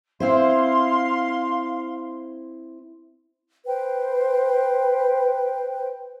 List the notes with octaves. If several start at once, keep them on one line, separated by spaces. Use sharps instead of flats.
C4 E4 C5 F5 C6
B4 C5 G5